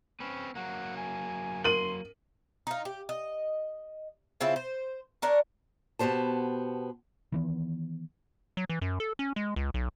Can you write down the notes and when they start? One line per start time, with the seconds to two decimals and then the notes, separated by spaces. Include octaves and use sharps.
0.20 C4 C#4 B4
0.55 F#3 A#3 F#5
0.97 G#5
1.64 A#4 C6 D#7 F#7
2.67 D#4 F4
2.85 G4
3.09 D#5
4.41 C#3 C4 E4 F4
4.56 C5
5.22 D4 A#4 C#5
5.99 B2 B3 G4 C5 A5
7.32 D#3 E3 B3
8.57 F#3
8.70 E3
8.82 F#2
9.00 A4
9.19 C#4
9.36 G#3
9.56 C#2
9.74 B1